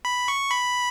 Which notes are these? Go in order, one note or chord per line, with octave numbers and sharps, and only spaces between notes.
B5
C#6
B5